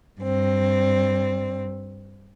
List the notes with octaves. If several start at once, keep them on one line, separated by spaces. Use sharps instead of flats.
G2 C4